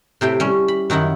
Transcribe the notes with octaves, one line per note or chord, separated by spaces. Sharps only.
A2 C3 E4 G5
G3 C#4
B5
F#2 D#3 D#4 E4 F#5